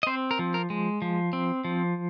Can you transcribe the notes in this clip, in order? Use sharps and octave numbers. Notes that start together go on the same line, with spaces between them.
D#5
C4 C5
A#4
F3
A#4
G#3
F3
C4
F3